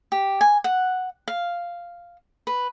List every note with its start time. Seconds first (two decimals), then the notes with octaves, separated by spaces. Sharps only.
0.12 G4
0.41 G#5
0.64 F#5
1.28 F5
2.47 B4